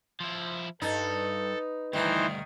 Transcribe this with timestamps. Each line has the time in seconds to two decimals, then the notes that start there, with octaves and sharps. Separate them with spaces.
0.20 F3 E4
0.82 G2 D#4 A4 B4
1.93 D2 G2 D#3 E3 D#4 C5